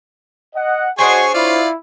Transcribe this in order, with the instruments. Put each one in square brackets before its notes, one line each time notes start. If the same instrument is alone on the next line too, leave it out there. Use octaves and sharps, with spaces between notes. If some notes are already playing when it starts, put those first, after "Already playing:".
[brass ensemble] D#5 F#5
[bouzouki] D4 C5 C#5 [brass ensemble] F#4 D#5 [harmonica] G#4 G#5 C#6
[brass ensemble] E4 [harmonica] F4 D5 F5